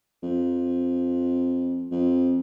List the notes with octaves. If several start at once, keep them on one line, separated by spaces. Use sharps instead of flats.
F2
F2